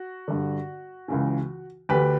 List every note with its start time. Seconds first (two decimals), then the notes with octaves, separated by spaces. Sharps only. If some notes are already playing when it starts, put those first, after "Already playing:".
Already playing: F#4
0.28 G2 D3
1.08 C#2 C#3 E3
1.89 D2 D3 G4 B4